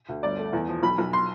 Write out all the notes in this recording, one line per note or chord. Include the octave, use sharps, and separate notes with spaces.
D2
G1 D5
A3
E2
F3
B1 B5
B1
C6